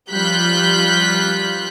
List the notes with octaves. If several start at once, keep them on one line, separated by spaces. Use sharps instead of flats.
F3 G3 F4 F#6 G6 B6